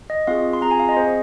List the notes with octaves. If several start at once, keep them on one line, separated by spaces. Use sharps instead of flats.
D#5
C4 F4 G#4 F5
C6
C4 F4 G#4 A#5
G#5
F5
D#5
C4 G#4 C5